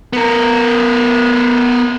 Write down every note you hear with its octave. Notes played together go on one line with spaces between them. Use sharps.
B3 A#4